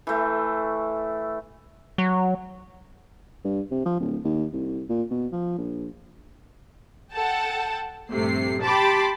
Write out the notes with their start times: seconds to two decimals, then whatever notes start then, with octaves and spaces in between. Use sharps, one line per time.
0.07 E3 A3
1.98 F#3
3.44 G2
3.71 C3
3.85 F3
3.99 D1
4.24 D#2
4.53 C2
4.89 A#2
5.11 B2
5.32 F3
5.58 A#1
7.13 A4 F#5 G5 A5
8.12 A#1 G2 C3 A3 C7
8.63 G4 G5 A5 B5 C6 D6